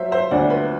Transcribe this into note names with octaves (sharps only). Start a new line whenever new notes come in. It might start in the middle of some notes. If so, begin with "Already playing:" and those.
Already playing: F#3 C5 E5
C5 E5
D2 D5 F#5
B4